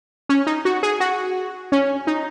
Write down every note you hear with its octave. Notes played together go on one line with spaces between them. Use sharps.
C#4
D#4
F#4
G#4
F#4
C#4
D#4